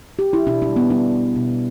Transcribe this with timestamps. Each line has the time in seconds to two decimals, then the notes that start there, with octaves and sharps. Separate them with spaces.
0.19 G4
0.33 E4
0.46 B2 D4
0.62 D4
0.68 G3
0.76 B3
0.90 G3 D4
1.13 B2
1.36 B2